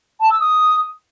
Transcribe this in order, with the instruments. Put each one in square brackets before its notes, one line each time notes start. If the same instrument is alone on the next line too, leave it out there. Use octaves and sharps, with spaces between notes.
[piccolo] A5
E6
D#6